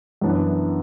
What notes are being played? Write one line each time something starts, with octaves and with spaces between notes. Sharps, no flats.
F#2 E3 B3 D4